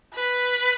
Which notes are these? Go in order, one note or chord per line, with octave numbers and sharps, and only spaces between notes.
B4